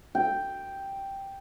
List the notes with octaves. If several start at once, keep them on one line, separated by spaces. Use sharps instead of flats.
G5